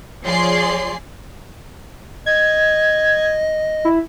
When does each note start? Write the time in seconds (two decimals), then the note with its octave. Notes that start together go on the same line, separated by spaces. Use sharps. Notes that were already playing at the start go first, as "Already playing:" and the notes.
0.24 F3 G#4 C#5 D5 C6 C7
2.26 D#5 G#6
3.85 E4